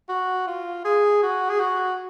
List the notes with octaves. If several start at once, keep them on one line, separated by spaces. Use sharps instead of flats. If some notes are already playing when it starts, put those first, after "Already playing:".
F#4
F4
G#4
F#4
G#4
F#4